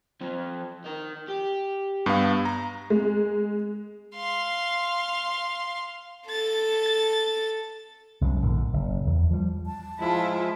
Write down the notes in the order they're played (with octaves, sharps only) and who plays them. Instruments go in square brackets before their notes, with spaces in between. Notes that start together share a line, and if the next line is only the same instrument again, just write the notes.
[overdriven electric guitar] F3 C4
D#4 A#4
G4
[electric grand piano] G2 B3 F5
A#5
[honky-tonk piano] G#3
[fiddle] F5 C6
[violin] A4 A6
[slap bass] C2 F#2 B2 G#3
A#1 G#2 D3 D#3
F#1
E2
F3 G3
[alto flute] A5
[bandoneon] F3 G#3 [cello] E4 F4